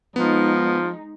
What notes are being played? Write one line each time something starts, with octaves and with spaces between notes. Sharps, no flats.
F3 G#3 B3 D#4